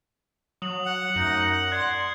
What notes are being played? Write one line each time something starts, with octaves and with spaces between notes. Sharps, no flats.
F#3 D#6 F#7
F#5
F#2 A3 D#4
D5 C6 F#6 G#6